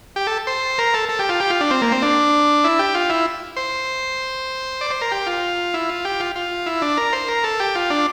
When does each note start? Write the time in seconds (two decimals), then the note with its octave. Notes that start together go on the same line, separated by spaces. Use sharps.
0.16 G4
0.27 A4
0.47 C5
0.78 A#4
0.94 A4
1.09 A4
1.19 G4
1.29 F4
1.40 G4
1.50 F4
1.60 D4
1.71 C4
1.82 A#3
1.92 C4
2.02 D4
2.64 E4
2.79 G4
2.94 F4
3.10 E4
3.57 C5
4.81 D5
4.91 C5
5.01 A#4
5.12 G4
5.26 F4
5.74 E4
5.89 F4
6.05 G4
6.20 F4
6.36 F4
6.66 E4
6.82 D4
6.97 A#4
7.13 C5
7.28 A#4
7.44 A4
7.60 G4
7.75 F4
7.90 D4